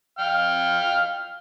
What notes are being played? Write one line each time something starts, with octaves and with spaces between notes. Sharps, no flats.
F5 G5 F6